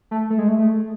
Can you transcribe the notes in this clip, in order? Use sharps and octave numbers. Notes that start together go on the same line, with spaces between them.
A3
A3
G#3
A3
A3